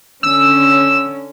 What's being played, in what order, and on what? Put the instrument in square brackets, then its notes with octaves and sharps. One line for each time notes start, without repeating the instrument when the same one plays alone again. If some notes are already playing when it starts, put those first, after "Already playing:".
[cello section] D3 C#4 [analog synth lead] E6